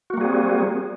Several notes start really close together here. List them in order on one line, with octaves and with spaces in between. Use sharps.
F#4 A#3 G3 G#4 C4